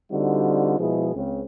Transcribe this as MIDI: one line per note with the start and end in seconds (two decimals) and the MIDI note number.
0.11 0.77 50
0.11 0.77 55
0.11 0.77 60
0.11 0.77 63
0.11 0.77 65
0.11 0.77 66
0.79 1.10 47
0.79 1.10 53
0.79 1.10 56
0.79 1.10 64
0.79 1.10 68
1.15 1.41 37
1.15 1.41 49
1.15 1.41 60